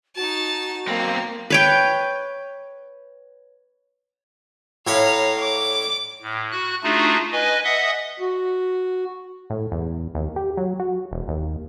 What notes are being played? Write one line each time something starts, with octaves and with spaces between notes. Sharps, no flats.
D#4 F#4 A5
B1 A#3 C4
B4 C#5 G5
A2 C#5 F5 A#5 B5
D6
A2
F#4 F#6
A3 D4 D#4 F4 F#4 G#4
B4 D#5 G#5
D#5 E5 F#5 D#6
F#4
A2
E2
D#2
G4
F#3
F#4
E1
D#2